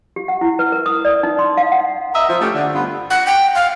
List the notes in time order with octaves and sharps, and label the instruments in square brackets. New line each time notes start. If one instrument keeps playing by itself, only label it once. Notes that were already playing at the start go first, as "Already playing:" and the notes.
[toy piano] G4
F#5
E4
B4
A#4
D#6
D5
D#4
C6
F5
F#5
[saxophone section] A#4 D#5 E5
F3
A3 C#4 G4
D3
G2 B3 F4
[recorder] F#5
G5
F5